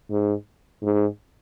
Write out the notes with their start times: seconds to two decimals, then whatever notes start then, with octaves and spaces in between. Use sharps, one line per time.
0.11 G#2
0.83 G#2